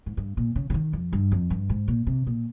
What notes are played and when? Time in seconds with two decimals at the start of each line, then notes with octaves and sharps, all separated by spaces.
0.06 G#2
0.17 G2
0.37 A#2
0.56 C#3
0.70 C#3
0.74 D#3
0.93 F2
1.13 G2
1.32 F2
1.50 G2
1.70 G#2
1.88 A#2
2.07 C3
2.27 A#2